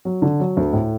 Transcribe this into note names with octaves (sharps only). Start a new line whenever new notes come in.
F#3
D3
F#3
D2
A2